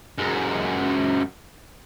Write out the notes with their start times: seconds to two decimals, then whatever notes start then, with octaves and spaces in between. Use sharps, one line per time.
0.18 F#2 G#3